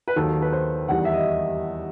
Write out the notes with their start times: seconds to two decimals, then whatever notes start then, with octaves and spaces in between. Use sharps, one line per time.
0.08 B4
0.16 D#2 D#3 F#3 A4
0.42 B4
0.53 C5
0.88 E2 D#3 G3 F#5
1.05 E5
1.13 D#5